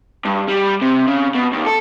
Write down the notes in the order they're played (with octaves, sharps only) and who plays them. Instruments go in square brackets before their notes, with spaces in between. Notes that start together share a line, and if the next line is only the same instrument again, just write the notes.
[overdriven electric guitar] G2
G3
C3
C#3
B2
D#2
A4